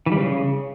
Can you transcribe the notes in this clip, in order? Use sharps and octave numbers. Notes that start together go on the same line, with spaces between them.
E3
G3
C#3